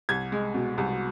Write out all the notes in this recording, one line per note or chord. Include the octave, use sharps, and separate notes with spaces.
C2 G#6
G#3
B2
C2